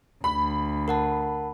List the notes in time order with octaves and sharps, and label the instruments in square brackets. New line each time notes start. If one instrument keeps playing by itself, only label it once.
[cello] D2 [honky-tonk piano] B5
[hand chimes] A#4 F#5 A5